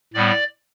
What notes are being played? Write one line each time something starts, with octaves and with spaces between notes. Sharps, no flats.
A2 G3 B3 D5